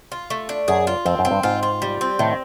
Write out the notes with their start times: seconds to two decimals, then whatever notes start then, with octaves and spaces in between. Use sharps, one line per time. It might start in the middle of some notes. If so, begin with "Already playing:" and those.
0.12 F4
0.30 A3
0.49 D4
0.68 F#2 G#4
0.87 F4
1.05 F2 C4
1.19 F#2
1.25 C4
1.31 G2
1.43 G#2 F4
1.63 F4
1.82 G3
2.01 C4
2.19 A2 D#3